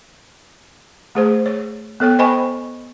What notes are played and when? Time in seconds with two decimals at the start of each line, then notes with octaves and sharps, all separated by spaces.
1.15 A3 G#4 C5
1.46 C#5
2.00 B3 A4 C#5 G5
2.19 C5 D#5 G5 G#5 B5 C#6